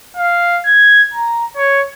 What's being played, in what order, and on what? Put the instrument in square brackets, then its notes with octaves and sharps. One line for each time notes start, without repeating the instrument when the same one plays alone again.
[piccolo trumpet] F5
G#6
A#5
C#5